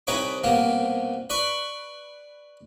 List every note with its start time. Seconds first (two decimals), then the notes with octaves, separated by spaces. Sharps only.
0.07 C2 D#4 B4 C#5 D6
0.44 C2 B2 A#3
1.30 B4 D5 B5 C#6